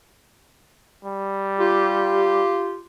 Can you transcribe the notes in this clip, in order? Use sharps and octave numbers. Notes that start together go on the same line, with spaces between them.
G3
F4 G4